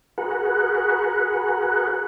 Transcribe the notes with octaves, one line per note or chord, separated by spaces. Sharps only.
F#4 G#4 A#4 B4 F#5